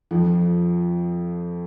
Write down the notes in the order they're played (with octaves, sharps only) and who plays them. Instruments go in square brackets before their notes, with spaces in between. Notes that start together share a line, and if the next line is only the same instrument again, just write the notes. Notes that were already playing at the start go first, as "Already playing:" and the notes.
[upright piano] F2 F3